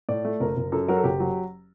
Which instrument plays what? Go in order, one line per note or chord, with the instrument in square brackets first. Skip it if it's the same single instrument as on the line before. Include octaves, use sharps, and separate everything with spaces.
[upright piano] A2 D5
A3
F#1 A#4
F#1
F#2 A4
F#3 A#4
A4
F#1 G4
F#3